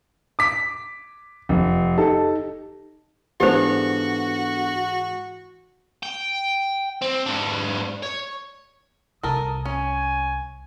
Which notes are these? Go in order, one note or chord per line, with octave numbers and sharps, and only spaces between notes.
D6 B6
F1
D#4 G4 A4
G#2 E3 B3 D4 F#4 G4 A4 C5
G5
C4
G#2 D4
C#5
C2 A4 A#4 D#6
C#4 G#5